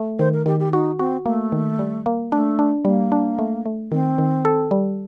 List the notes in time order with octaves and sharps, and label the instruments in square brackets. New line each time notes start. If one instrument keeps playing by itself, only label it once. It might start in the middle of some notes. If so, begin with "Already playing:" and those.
Already playing: [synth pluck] A3
[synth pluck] D#3 [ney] C5
[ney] A#4
[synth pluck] D#3 [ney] G4
[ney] G4
[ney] D#4 [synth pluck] F#4
[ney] C4 [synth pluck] F#4
[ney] A3 [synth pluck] A#3
[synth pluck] D#3
G3
A#3
[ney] A3 [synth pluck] D4
[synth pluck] D4
[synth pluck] G3 [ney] A#3
[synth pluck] D4
A3
A3
[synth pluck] D#3 [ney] C4
[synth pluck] D#3
A4
G3